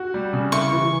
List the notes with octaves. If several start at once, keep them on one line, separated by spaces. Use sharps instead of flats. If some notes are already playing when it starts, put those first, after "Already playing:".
Already playing: F#4
G3
C#3
E4 C#6
E3